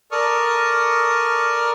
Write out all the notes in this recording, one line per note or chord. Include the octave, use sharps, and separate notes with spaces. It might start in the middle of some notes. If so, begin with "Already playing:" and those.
A4 A#4 D5 C#6 D#6 F6